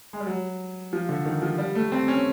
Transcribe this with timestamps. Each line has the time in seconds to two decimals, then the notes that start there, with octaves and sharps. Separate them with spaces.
0.13 G#3
0.20 G3
0.27 F#3
0.93 F3
1.09 D3
1.25 D#3
1.42 F3
1.58 G3
1.75 A3
1.92 C4
2.08 C#4